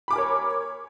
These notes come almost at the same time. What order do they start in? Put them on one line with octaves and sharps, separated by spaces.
B5 D6 G#5 A#4 C#5